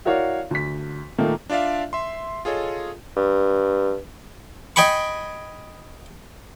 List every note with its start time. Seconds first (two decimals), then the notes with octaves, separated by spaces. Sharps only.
0.05 E4 F#4 A#4 C#5 D5 F5
0.51 D2 B6
1.18 A#2 D#3 A3 A#3
1.49 D4 F4 D5 E5 F5
1.93 E5 C6
2.45 F4 G#4 A4 C#5 D#5
3.16 G2
4.76 D#5 G5 G#5 B5 C#6